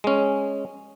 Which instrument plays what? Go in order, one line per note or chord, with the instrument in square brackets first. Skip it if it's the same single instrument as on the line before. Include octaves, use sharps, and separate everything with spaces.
[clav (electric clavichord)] G#3 C#4